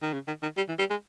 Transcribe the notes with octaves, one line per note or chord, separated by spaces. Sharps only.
D#3
C#3
D#3
D#3
G3
E3
G3
G#3